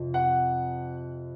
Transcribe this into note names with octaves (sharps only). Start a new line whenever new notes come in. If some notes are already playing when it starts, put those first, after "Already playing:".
Already playing: F2 C3 F3
F#5